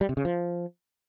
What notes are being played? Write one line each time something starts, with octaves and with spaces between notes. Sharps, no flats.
G3
C3
C#3
F3